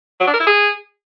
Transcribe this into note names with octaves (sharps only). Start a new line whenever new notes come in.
F#3
D4
A#4
E4
G#4